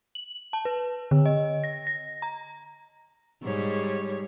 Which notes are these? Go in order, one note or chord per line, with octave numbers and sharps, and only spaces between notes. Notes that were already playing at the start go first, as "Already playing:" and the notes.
F#7
A5
B4
D3
D#5
A#6
A#6
A#5
G#2 G3 C#5